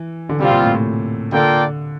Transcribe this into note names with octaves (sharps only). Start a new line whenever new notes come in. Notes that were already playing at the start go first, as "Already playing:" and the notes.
Already playing: E3
D3
C3 G3 C4 F4
A#2
A2
A2
D3 A#3 F4 A4 D5 G5